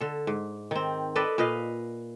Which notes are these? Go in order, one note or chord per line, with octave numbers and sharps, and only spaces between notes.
D3 A4
G#2
D#3 C4
A4 B4 D5 D#5
A#2 B4 D#5 F5